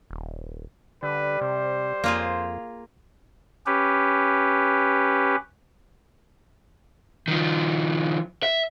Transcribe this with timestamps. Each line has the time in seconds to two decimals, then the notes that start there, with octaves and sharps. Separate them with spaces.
0.11 D#1
1.03 D3 G3 B4
1.41 C3 C5
2.04 F2 A#3 F4 G#4
3.66 C#4 G4 B4
7.28 D#3 F3
8.43 E5